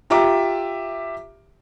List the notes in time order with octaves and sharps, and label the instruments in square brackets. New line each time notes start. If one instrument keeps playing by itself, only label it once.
[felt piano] F4 G4 E5 A#5 D6